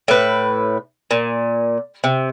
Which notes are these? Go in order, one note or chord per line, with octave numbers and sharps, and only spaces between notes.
A2 B4
A#2
C3